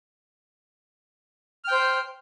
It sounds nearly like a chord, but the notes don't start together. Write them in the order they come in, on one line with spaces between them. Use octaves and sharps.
F6 G5 C5